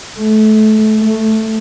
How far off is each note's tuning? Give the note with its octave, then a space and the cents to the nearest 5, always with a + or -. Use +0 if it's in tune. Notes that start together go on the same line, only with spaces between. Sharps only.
A3 -25
A3 +0